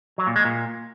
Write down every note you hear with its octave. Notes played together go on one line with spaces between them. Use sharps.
F#3
A#2
G#3
A#2